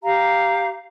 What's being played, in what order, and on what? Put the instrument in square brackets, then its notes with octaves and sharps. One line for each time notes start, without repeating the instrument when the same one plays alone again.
[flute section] G4 F5 A#5